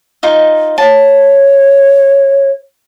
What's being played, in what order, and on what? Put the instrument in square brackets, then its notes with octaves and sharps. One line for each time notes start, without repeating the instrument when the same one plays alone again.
[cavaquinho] D#4 F4 D#5
[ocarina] C#5 [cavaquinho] A5